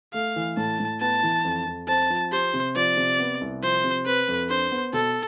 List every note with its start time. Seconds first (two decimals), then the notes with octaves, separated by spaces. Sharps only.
0.14 A3 F5
0.36 E3
0.57 A2 A5
0.80 A2
1.01 B3 A5
1.23 E3
1.44 F2
1.66 F2
1.88 C4 A5
2.10 F3
2.32 G4 C5
2.54 C3
2.75 F3 D5
2.97 C3
3.20 B3
3.41 C2
3.63 F3 C5
3.84 C3
4.06 C4 B4
4.28 F2
4.50 D4 C5
4.72 B3
4.93 B2 A4